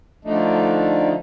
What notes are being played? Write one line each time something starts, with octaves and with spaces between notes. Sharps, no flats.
D3 F3 A3 D4 D#4